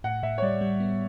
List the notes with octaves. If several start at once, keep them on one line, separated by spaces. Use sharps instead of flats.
A2 F#5
A2 E5
C#5
G3 D5
G3
B3